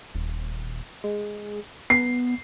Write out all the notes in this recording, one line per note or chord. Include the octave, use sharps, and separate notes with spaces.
D#1
G#3
B3 C7